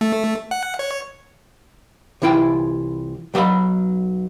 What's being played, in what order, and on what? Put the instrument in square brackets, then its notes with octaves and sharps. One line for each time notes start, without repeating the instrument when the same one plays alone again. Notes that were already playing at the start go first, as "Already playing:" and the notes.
[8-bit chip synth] A3
F#5
C#5
[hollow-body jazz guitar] C2 E3 E4 F4 G5
B1 F#3 D5 F5 B5